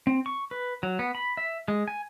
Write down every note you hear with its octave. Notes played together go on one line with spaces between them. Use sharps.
C4
C#6
B4
F#3
B3
B5
E5
G#3
G#5